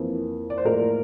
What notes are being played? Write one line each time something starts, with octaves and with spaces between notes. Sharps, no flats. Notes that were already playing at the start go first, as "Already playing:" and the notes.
Already playing: F2 E3 A#3
D5
C5
A2 F3 A#3 A#4